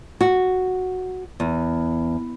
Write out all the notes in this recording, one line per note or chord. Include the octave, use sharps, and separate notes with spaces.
F#4
E2